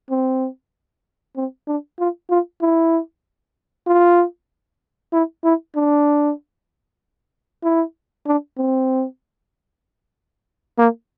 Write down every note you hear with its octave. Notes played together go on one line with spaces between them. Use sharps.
C4
C4
D4
F4
F4
E4
F4
E4
E4
D4
E4
D4
C4
A#3